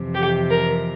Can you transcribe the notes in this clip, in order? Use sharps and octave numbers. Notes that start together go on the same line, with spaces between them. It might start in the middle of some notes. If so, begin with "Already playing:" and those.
Already playing: F2 C3 E3
G4
A#4